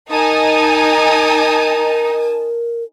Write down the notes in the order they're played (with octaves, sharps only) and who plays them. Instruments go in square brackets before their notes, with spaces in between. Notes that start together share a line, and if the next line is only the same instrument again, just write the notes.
[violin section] D#4 [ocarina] A#4 [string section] G#5 A5 D#6